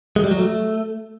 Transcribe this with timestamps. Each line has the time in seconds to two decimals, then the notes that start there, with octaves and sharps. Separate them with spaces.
0.16 G#3
0.24 G3
0.31 F#3
0.39 A3